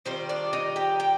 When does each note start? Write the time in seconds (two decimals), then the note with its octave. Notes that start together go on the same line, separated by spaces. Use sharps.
0.05 D#3 G3 C4 F4 C5
0.29 D4 D5
0.53 D#4 D#5
0.76 G4 G5
1.00 G5